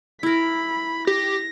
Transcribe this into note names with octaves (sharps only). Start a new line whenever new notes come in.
E4 A#4 B5
G4 A#6